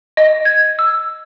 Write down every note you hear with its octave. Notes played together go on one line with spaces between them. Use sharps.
D#5
G#6
E6